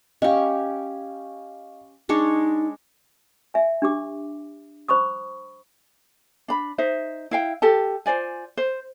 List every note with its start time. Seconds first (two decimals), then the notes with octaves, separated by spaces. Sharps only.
0.22 C#4 G4 D#5 F5
2.09 G#3 D4 D#4 C#5
3.54 E5 G#5
3.82 D4 G4 D6
4.88 C5 B5 C#6 D#6
6.48 D4 B5
6.78 D#4 C5 E5
7.31 E4 F5 G5
7.62 G4 A4 A5
8.06 F4 C5 D5 G#5
8.57 C5